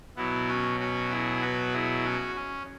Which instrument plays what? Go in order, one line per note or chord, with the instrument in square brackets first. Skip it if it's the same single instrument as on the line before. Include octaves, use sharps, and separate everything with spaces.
[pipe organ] B2 F#3 B3 E4
C#4 F#4
C#4 F#4
E4 G#4
F#4 B4
E4 G#4
C#4 F#4
C#4